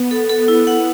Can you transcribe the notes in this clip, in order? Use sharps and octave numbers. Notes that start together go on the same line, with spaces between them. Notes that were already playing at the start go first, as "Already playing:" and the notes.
Already playing: B3
A4
A4
E4
F#5